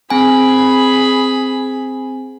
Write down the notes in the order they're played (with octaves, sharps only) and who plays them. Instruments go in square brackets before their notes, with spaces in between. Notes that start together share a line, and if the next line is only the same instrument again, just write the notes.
[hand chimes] C4 G#5 [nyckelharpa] G#4 B5